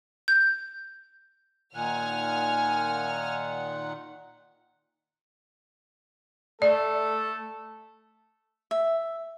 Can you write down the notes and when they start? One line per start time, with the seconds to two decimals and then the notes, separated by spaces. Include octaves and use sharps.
0.28 G6
1.74 A#2 D#3 F#5 G#5 F6
6.62 A3 A4 D5
8.71 E5